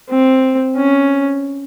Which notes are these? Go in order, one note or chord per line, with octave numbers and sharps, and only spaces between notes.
C4
C#4